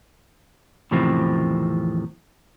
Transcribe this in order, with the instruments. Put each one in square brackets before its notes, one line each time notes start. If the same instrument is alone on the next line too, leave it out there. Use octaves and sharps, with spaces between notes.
[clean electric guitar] E2 A2 C3 D#3 F3 C4